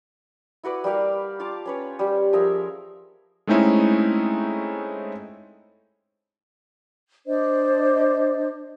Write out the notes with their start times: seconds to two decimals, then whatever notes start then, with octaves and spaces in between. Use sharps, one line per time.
0.63 E4 F#4 B4 D5
0.84 G3 A#3 G4 F5
1.40 F4 F5 A5 D6
1.65 C#4 B4 C#5
1.99 G3 G4
2.33 F3 G#4 A#4 E5
3.47 G#3 A3 C4 C#4 D#4 E4
7.26 D4 C5 D5 D#5